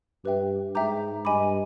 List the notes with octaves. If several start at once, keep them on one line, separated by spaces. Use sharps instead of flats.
G2 G4 B4 E5 G5
G#2 E5 G5 A#5 D6 G6
G2 D#5 G#5 B5 D6